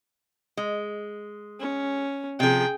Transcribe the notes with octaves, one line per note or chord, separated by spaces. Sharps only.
G#3
C#4
C3 F3 G#4 G5